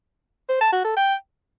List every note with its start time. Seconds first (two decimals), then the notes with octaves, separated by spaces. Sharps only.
0.49 C5
0.61 A5
0.73 F#4
0.84 A4
0.96 G5